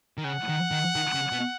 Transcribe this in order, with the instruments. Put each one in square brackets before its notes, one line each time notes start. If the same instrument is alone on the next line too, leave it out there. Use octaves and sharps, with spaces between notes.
[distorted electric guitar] D#3
[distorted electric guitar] C#3 [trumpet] F#5
[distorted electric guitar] D#3
D#3
D#3
C#3
B2